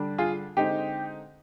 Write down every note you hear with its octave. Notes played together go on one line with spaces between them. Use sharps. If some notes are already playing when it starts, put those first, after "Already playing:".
Already playing: D3 G3 D4
F4 G#4
D3 G#3 C4 D#4 G4